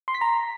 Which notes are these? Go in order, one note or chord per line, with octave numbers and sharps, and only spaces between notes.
C6
B6
A#5